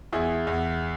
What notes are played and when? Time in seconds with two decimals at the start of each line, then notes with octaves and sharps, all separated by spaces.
0.12 E2 E4 G#4
0.47 E2